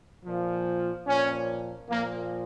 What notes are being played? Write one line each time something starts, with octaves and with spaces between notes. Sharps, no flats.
A#2 F3
A#2 F3 C#4
A#2 F3 A#3